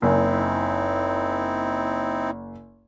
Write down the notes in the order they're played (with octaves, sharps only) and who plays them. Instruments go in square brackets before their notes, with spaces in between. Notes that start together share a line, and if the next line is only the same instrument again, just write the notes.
[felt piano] F#1 [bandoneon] C4 D#4 E4